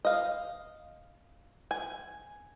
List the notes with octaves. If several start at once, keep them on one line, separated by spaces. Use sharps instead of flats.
D#5 F5
G#5